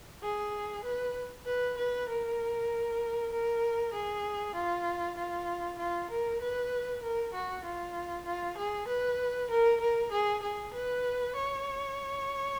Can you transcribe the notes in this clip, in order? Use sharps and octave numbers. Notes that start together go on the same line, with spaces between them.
G#4
B4
B4
B4
A#4
A#4
G#4
F4
F4
F4
A#4
B4
A#4
F#4
F4
F4
G#4
B4
A#4
A#4
G#4
G#4
B4
C#5